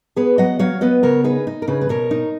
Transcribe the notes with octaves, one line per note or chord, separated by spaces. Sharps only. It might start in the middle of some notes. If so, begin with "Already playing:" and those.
B3 G#4 B4
F#3 D#5 F#5
F#3 C#5 F5
B3 B4 D#5
C#3 A#4 C#5
D#4 G#4 B4
D#4
A#4
C#3 G#4 B4
B4
B2 A#4 C#5
D#4